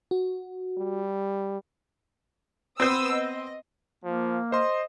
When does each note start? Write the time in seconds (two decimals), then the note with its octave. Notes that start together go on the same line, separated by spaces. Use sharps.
0.11 F#4
0.78 G3
2.80 B3 C4 C5 D#6 E6
3.15 D#5
4.04 F3 A#3
4.52 C5 D#5 C6